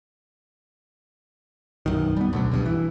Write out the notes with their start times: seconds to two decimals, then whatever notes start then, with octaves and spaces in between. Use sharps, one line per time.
1.86 B1 F#2 D#3
2.17 G3 B3
2.33 D2 B2 F#3
2.51 C2 G2 B2
2.66 E3